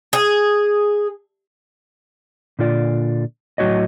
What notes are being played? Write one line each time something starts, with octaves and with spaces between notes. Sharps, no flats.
G#4
A#2 D3 F4 D5
A2 F#3 C4 F#4 C#5 D#5